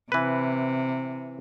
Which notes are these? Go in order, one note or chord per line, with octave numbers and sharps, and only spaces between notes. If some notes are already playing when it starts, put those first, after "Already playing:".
C3 E3 B4